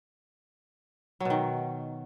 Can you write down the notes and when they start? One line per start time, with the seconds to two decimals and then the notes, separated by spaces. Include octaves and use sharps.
1.20 F#3
1.25 B2
1.30 D#3